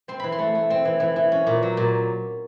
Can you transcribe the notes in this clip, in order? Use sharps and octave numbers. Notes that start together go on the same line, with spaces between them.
C4 C6
E3 B5
C6
A3
A3
C4
E3
E3
E3
C#4
A#2
F#3
A#2